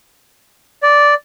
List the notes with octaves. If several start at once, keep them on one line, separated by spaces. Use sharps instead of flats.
D5